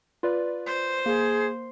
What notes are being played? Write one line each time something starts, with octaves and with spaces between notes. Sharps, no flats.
F4 B4 D5
C5
A#3 G#4